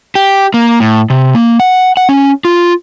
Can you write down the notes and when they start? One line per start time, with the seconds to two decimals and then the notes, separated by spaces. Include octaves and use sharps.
0.15 G4
0.54 A#3
0.80 A2
1.10 C3
1.35 A#3
1.60 F#5
1.97 F#5
2.09 C#4
2.45 F4